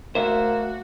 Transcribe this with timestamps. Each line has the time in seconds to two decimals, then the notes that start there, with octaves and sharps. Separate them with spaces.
0.15 A3 A#3 F#4 C5 E5